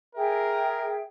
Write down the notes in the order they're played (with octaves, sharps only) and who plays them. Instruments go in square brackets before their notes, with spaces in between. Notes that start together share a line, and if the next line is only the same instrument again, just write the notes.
[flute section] G#4 E5 G5 [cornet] A#4